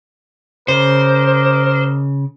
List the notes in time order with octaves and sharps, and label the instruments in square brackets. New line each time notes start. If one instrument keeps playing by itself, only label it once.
[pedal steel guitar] C#3 [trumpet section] A#4 D#5 D6 [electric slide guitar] C5